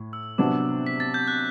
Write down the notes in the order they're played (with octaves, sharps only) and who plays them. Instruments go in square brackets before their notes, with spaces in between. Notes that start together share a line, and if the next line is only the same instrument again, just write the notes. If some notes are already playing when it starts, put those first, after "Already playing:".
Already playing: [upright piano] A2
[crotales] E6
[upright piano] C3 F#3 B3 D4 [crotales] D6
[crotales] B6
A6
G6
F#6